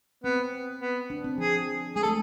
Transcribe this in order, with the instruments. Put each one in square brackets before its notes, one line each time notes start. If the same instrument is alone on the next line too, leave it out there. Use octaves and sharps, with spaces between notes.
[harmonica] B3 [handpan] C4
[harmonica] B3
[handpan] D4
C4
[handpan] F3 [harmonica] G#4
[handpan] G#3 [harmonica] G#4
[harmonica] A4
[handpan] A3